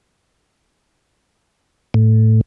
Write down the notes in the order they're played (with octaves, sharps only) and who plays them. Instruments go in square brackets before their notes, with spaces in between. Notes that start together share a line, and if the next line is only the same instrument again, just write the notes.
[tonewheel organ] A2